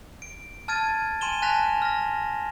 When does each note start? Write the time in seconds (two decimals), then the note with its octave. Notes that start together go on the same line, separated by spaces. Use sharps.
0.22 D7
0.68 A5 F6 G#6 A6 D#7
1.21 G#5 C6 D#7 E7 G7
1.42 G#5 A5 F#6 A#6 B6 F7
1.82 F6 A#6